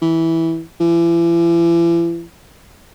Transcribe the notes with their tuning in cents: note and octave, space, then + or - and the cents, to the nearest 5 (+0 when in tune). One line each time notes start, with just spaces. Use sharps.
E3 -10
E3 +40